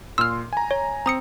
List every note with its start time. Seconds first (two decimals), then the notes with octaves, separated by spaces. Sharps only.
0.18 A#2 C6 E6 F6
0.53 G#5 A#5
0.71 C#5
1.06 C4 A#5 D#6 C#7